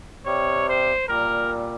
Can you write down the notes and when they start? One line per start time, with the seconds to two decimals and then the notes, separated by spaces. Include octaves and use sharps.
0.25 C3 G3 C#5
0.67 C5
1.08 A#2 G3 A#4